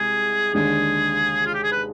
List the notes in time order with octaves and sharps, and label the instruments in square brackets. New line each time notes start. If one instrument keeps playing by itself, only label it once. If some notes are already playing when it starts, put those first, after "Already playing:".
Already playing: [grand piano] C2 C3 G#3 [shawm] G#4
[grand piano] D#2 D3 G#3 D4 [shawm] G#4
[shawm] F4
G4
G#4
B4